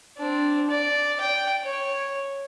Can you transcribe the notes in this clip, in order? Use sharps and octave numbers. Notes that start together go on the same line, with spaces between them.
C4 D4
D5
G5
C#5